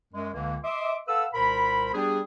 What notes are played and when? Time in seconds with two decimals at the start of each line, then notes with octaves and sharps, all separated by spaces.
0.14 F#2 G#3
0.34 C#2 D3 E3 A#3
0.64 D#5 E5 C6 D6
1.07 A4 B4 F5 F#5 E6
1.34 C2 A#2 A#4 C5 B5
1.93 G3 B3 D4 G4 G#4